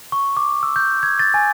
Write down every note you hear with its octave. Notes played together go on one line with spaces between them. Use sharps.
C#6
D6
E6
G6
G#6
A6
G#5